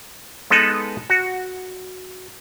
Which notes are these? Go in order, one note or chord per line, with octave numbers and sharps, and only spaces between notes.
G#3 B3 D#4 A4 B4
F#4